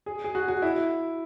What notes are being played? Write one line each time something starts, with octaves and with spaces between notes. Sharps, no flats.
G#4
G#4
F#4
F#4
E4